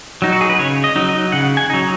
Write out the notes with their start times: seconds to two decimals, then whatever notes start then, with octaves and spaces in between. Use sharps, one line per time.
0.22 F#3 D#4
0.32 F#4
0.41 G#4
0.50 B4
0.59 C#3 C#5
0.84 D#5
0.96 F#3 D#4
1.09 D#5
1.32 C#3 F#5
1.57 G#5
1.70 F#3 D#4